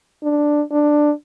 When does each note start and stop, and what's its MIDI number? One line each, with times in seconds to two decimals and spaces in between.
0.23 0.62 62
0.72 1.11 62